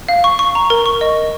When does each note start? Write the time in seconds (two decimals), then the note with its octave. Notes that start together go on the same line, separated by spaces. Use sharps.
0.09 F5
0.24 C#6
0.39 C#6
0.55 A#5
0.70 A#4
0.86 C#6
1.01 D#5
1.17 A#4